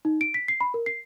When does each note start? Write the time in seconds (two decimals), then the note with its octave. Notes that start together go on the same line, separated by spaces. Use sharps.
0.05 D#4
0.21 D7
0.34 B6
0.48 C7
0.61 B5
0.74 A#4
0.86 C7